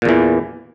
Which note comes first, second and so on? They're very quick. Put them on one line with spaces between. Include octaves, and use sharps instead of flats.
A#2 E2 E3